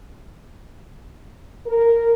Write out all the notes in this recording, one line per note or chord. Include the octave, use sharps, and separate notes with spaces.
A#4